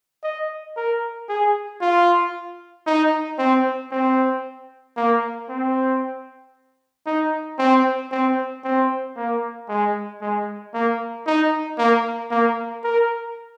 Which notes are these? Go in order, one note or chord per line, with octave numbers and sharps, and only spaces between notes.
D#5
A#4
G#4
F4
D#4
C4
C4
A#3
C4
D#4
C4
C4
C4
A#3
G#3
G#3
A#3
D#4
A#3
A#3
A#4